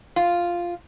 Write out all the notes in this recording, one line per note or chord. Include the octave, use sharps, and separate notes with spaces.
F4